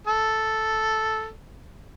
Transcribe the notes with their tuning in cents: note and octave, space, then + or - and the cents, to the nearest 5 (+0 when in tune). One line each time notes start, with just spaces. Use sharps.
A4 -5